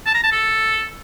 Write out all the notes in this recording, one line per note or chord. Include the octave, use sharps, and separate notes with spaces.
A5
A#5
A5
A4